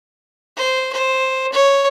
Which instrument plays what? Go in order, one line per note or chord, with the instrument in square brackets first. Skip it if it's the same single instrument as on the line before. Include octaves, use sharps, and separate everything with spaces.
[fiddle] C5
C5
C#5